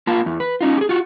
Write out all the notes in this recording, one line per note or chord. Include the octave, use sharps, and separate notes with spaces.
A#3 F4 A#4 A5
E2
B4
C#4 D#4 F4
G4 G#4
F4 F#4